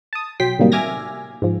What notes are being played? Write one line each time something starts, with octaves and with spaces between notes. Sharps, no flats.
A5 D#6
B1 F#3 G5 C6 B6
A2 C3 D#3 F#3 G3 A#3
E5 G#5 D6 F6 G#6 A#6
G#2 F3